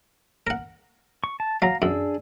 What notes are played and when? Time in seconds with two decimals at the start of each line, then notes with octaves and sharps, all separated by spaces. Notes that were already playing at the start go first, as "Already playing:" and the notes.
0.47 A#4 F#5
1.24 C#6
1.40 A5
1.62 F#3 F5 A#5
1.82 F#2 D4 G#4 E6